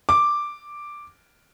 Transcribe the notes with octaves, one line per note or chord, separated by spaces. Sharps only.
D6